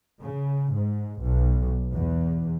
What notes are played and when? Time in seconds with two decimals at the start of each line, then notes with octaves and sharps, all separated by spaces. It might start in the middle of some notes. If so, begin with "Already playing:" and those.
0.22 C#3
0.73 G#2
1.22 B1
1.94 E2